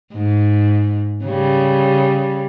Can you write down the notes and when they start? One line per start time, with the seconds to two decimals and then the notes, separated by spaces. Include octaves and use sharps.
0.13 G#2
1.24 C#3 G3